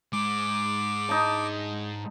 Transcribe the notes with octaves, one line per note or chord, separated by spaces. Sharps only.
G#2 G#3 D6
D#4 A5